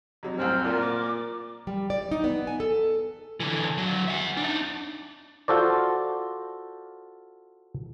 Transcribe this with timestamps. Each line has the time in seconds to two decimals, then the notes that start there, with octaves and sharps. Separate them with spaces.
0.23 F2 C3 F#3
0.38 C2 F#2 A2 C4 F6
0.64 A#2 D5
0.81 D6
1.67 G3
1.90 D5
2.12 D#4
2.24 B3
2.47 G#5
2.60 A4
3.40 D3 E3
3.78 D3 F#3
4.08 E5 F#5
4.37 D4 D#4
5.48 F4 F#4 A4 C5 D5